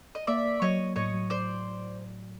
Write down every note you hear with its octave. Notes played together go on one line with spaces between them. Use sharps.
D#5
A#3 D5 E5
A#3
F#3 C#5 D#5
F#3
A2 C#5 D#5
F#3
C5 D5